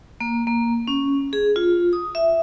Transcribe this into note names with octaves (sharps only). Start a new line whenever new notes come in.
A#3
A#3
C#4
G#4
F4
D#6
E5